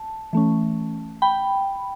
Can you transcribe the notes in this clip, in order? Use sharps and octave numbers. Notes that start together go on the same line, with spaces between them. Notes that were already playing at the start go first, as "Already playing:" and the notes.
Already playing: A5
E3 A3 C#4
G5 B5